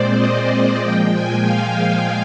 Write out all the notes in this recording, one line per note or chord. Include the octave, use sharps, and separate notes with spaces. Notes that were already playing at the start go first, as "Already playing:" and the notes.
Already playing: A#2 G#3 C4 C5 D5
D#5
A#2 F3 G#3 G5
G#5
F5
F5